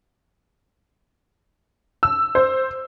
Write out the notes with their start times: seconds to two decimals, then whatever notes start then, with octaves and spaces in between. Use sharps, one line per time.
2.03 E6
2.35 C5